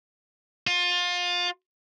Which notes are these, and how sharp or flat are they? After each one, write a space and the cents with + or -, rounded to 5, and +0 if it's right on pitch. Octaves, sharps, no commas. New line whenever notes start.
F4 +25